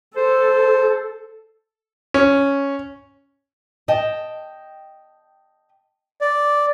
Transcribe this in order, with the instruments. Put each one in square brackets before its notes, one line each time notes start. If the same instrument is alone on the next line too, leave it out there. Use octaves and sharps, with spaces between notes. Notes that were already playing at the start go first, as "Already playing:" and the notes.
[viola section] A4 [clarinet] C5
[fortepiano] C#4
[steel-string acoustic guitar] D#5 G5 A5
[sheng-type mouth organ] D5